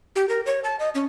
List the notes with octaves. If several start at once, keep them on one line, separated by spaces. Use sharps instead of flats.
G4
A#4
C#5
A5
D#5
C#4